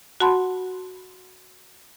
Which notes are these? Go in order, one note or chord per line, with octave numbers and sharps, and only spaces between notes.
F#4 F#5 A5 B5 C6